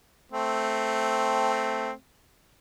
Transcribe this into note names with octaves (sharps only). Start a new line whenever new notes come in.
A3 C4